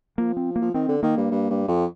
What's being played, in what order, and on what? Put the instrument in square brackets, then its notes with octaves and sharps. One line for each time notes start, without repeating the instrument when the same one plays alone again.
[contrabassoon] F3 [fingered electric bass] A#3
[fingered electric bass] C4
A#3
[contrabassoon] F3
[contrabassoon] D#3 [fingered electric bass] C4
[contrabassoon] D3
[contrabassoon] D#3 [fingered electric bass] A#3
[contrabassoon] G2
G2
G2
F2